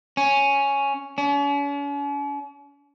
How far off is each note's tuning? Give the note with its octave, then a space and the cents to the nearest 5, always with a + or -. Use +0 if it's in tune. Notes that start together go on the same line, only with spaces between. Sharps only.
C#4 +0
C#4 +45